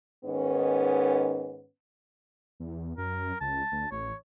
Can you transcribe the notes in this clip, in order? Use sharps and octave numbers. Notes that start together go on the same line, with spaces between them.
G#2 D#3 B3 C#4
E2
F#2 A#4
C#2 A5
D2
A1 C#5